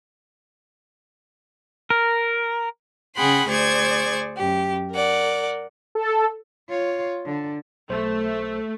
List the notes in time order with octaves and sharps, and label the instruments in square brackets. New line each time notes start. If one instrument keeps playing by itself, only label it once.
[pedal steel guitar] A#4
[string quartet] C#3 G#4 F#5 G5 B5 C6
D2 G#4 C5 D5 C#6 G#6
F#2 G4
A#4 D5 F#5
[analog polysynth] A4
[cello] F4 C#5
D3
[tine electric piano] B1 C5 [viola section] A3